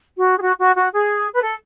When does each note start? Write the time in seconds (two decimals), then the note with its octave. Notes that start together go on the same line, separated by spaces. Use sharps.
0.17 F#4
0.37 G#4
0.41 F#4
0.59 F#4
0.76 F#4
0.92 G#4
1.34 B4
1.42 A4